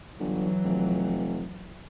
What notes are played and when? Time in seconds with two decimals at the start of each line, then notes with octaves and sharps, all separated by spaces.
0.20 G1 E3 F#3
0.64 F1